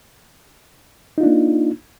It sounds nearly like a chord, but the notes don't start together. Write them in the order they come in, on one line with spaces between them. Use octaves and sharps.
D#4 F4 D4 A#3